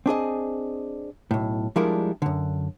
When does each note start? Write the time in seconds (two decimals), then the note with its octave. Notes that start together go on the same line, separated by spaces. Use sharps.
0.06 C4 D4 G#4 D#5
1.31 B1 A2
1.76 F3 G3 G#3 D4 E4 A#4
2.22 F#2 D3